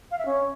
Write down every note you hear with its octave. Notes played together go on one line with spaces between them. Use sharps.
F5
E5
C#4